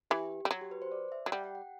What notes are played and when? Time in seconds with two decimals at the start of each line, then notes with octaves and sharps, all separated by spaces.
0.11 E3 G4
0.45 G3
0.51 F#3 F#4
0.61 G4
0.71 B4
0.82 C5
0.92 D5
1.12 E5
1.26 F#3
1.32 G3 F#5
1.44 G5
1.55 F#5